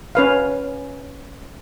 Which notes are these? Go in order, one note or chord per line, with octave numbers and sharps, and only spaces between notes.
C#4 B4 F5